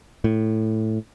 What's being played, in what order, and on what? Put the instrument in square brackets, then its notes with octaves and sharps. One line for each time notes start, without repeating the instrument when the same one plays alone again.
[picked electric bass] A2